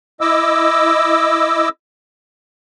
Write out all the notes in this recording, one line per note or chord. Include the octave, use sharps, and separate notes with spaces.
E4 D#5 D6 E6